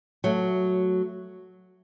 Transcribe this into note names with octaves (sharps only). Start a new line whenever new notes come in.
F#3 A3